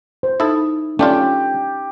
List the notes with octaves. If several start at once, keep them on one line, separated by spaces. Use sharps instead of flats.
C5
D#4 E4 A4
A3 C#4 D4 F4 G4